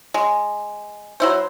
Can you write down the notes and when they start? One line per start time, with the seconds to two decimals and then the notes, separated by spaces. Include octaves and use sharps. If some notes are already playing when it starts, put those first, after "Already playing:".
0.14 G#3
1.20 F#3 E4 C5